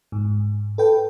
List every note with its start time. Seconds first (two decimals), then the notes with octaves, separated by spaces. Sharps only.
0.12 G#2
0.78 A4 B4 G5